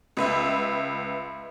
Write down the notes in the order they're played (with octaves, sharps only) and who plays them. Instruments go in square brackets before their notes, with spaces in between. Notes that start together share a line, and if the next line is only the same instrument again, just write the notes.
[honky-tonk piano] C#2 B4 E5